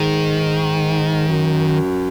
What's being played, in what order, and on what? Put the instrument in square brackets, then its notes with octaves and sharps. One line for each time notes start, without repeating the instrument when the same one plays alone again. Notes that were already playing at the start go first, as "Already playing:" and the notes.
Already playing: [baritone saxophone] G#2 [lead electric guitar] D#3
[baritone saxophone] F#2